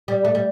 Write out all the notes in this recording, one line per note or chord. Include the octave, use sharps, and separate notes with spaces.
G3
A3
G3